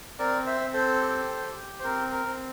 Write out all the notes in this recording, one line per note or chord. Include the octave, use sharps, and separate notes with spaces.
C4 A#4 D5
C5 E5
C4
A4 C5
G4
G4
C5
C4 A#4
A#4
C4